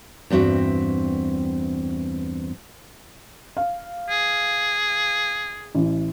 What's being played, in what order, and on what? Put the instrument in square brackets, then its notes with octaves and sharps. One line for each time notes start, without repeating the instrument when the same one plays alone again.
[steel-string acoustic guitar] E2 G2 C4 F#4 E5
[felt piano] F5
[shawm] G#4
[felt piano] A1 E3